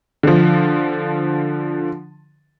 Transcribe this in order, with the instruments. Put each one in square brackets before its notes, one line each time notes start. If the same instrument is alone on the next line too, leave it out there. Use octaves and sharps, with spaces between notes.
[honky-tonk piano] D3 F3